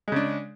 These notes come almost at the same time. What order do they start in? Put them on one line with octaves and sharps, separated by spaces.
G#3 C#3 D4